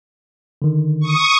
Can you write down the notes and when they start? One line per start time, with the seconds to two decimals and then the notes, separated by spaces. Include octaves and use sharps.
0.62 D3 D#3
1.00 C#6 D#6